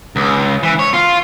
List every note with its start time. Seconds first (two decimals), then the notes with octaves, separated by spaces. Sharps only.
0.16 C#2
0.63 E3
0.79 C#5
0.93 F4